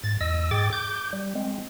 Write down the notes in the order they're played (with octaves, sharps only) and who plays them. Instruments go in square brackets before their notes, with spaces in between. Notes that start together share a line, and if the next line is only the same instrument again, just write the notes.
[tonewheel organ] G#2 A6
E2 D#5 E6
G#2 G#4 G5 D6 A6
D6 G6
G3
G#3 C4